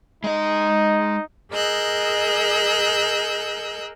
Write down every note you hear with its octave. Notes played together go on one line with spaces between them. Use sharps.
G#3 D#4 D#5
G#4 A#4 D#5 E6 F#6 G6